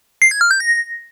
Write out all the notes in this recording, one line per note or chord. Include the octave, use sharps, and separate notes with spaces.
C7
G#6
F6
G6
A#6